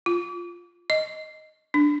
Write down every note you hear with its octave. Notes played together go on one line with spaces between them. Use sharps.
F4
D#5
D4